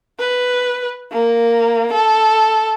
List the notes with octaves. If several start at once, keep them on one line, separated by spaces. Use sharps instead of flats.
B4
A#3
A4